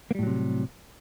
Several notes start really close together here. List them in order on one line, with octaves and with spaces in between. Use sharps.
A#3 G3 A2 F#3 C3